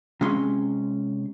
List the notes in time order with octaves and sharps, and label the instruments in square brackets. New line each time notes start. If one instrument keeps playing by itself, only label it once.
[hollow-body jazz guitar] C3 G#3 C#4 C6